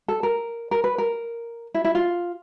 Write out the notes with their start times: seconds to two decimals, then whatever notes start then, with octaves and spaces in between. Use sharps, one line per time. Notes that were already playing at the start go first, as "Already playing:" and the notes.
0.08 A4
0.23 A#4
0.71 A#4
0.84 B4
0.98 A#4
1.74 E4
1.85 E4
1.95 F4